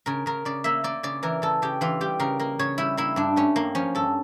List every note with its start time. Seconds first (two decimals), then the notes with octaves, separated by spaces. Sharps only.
0.06 C#3 A#4
0.26 C#3 A#4
0.45 C#3 D5
0.64 A#3 E5
0.84 A#3 D5
1.03 C#3 D5
1.23 E3 A#4
1.42 C#3 A4
1.62 C#3 G4
1.81 E3 F4
2.01 G3 G4
2.20 C#3 A#4
2.39 A#3 A#4
2.59 C#3 C#5
2.78 G3 E4
2.97 A#3 E4
3.16 G2 D4
3.36 A3 C#4
3.56 G2 A#3
3.75 F3 C#4
3.95 G2 A4